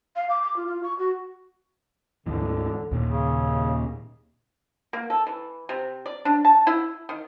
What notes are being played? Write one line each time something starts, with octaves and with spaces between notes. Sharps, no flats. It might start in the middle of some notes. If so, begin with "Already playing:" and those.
F5
D6
D6
F4
F4
C#6
F#4
D2 G#2 D3 E3
D#2 A#2
C#3
A#3
A4
E3
C3
D5
D4
A5
E4
D#3